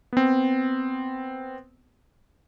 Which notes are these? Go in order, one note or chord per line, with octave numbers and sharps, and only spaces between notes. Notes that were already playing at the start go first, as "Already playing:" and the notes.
B3 C4